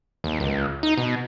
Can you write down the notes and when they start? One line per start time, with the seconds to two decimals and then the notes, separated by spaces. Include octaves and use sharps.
0.24 D#2
0.40 C#2
0.83 D#4
0.98 B2